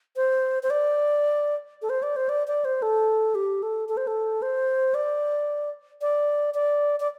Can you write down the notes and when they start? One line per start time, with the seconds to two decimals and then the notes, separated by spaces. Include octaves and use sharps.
0.16 C5
0.63 C5
0.70 D5
1.82 A4
1.90 C5
2.03 D5
2.16 C5
2.29 D5
2.48 D5
2.65 C5
2.82 A4
3.35 G4
3.63 A4
3.89 A4
3.97 C5
4.07 A4
4.42 C5
4.94 D5
6.01 D5
6.55 D5
7.00 D5